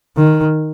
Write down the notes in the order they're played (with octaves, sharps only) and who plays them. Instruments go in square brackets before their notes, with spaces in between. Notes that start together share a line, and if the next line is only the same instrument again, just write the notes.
[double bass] D#3